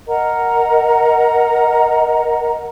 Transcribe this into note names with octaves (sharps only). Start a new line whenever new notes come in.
A#4 D#5 F#5 A#5